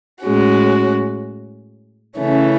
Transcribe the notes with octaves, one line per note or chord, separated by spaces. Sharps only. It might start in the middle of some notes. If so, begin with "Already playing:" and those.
A2 G#3 C#4 F#4
C#3 E3 A3 C#4